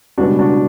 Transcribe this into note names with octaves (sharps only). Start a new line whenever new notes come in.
C#2 B2 G3 B3 D4 F#4
D4 F#4